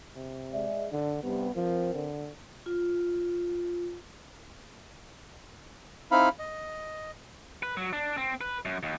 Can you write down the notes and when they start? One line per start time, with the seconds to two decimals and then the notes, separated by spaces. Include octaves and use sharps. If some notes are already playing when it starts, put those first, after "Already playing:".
0.16 C3
0.53 G#3 D5 E5
0.92 D3 D4
1.24 G2 C3 B3
1.55 F3 C4 A#4
1.95 D3
2.66 F4
6.11 C4 D#4 E4 F5 B5
6.39 D#5
7.63 B4
7.77 F#3
7.93 D4
8.17 C4
8.41 B4
8.65 F#2
8.83 D#2